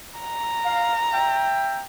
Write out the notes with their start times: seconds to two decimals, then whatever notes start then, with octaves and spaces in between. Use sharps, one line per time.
0.20 A#5
0.65 F5
1.13 E5 G5